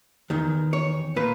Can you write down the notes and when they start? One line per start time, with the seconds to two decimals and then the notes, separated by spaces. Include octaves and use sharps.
0.30 E2 D#3
0.73 C#5
1.16 A#2 B4